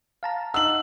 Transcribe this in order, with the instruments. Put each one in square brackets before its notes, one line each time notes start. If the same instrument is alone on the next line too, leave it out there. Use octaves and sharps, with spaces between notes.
[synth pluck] F5 A5 A#5
[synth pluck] D#4 D#5 F#5 [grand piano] E6 F#7